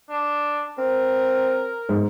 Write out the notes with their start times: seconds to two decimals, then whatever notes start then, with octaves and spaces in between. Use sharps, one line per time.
0.09 D4
0.78 C4 A#4
1.89 G#2